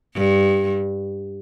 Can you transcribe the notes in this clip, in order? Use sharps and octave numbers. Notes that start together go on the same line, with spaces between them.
G2